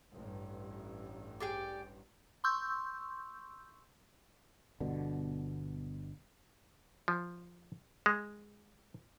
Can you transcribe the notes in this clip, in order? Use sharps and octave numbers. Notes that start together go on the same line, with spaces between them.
A1 G2
G4 G#4 D5
C6 C#6 E6 G6
G1 B2 D3
F3
G#3